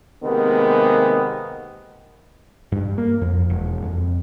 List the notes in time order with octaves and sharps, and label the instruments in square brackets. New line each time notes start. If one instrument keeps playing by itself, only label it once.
[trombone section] C3 D#3 G#3 A#3 B3
[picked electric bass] G2
A#3
F2
E1
F2